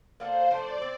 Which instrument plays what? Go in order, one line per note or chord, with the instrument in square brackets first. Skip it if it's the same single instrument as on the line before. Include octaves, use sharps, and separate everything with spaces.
[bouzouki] A#3 D4 F4 A4 [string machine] C5
[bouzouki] F3 A3 D4 [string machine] D5
[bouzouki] C4